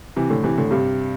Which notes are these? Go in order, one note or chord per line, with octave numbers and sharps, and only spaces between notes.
C3 E3
A2 D3
C3 E3
A2 D3
G2 C3